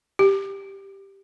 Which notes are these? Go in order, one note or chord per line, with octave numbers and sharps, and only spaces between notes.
G4